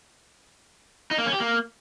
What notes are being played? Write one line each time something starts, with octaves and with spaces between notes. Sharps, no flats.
D#4
A#3
C#4
G4
A#3